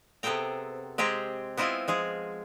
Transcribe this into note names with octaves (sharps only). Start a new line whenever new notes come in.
C3 B3 G#4 A4 G5 A#5
G#3 C4 G4 G#4 A#5
B3 C4 E4 F4 D#5 G#5
F3 G#3 G#4